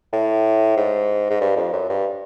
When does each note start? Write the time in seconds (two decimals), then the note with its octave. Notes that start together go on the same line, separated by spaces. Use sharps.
0.13 A2
0.77 G#2
1.30 G#2
1.41 G2
1.56 F2
1.73 F#2
1.89 G2